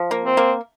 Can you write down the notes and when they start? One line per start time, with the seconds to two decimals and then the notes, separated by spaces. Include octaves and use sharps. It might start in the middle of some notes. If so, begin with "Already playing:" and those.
Already playing: F3
0.11 A#3
0.24 C4
0.37 A#3